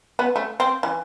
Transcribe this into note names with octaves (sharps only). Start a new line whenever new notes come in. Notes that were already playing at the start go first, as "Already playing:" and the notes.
B3
A3
C4
E3